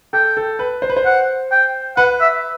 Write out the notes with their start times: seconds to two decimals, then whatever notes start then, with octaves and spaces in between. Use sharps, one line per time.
0.13 A4 G5
0.37 A4
0.59 B4
0.82 C5
0.89 B4
0.97 C5
1.05 F#5
1.51 G5
1.97 B4 F#5
2.21 E5